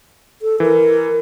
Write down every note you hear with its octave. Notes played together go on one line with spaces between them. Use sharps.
A4
E3 A#4